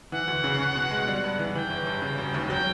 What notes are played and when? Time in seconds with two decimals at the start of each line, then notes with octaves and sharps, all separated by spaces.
0.12 E3 F#5
0.27 D2
0.44 C#3
0.59 C#4
0.75 B2
0.91 G#3
1.08 G3
1.24 G2
1.39 E3
1.55 E3 G5
1.70 G1
1.87 G2
2.02 C#3
2.18 E1
2.34 D#2
2.50 F#3 G5